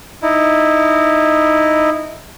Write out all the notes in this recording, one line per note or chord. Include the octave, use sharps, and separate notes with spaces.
D#4 E4